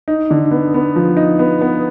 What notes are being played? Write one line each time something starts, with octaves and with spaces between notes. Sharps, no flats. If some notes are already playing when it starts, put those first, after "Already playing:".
D#4
D3
B3
B3
F3
D#4
B3
B3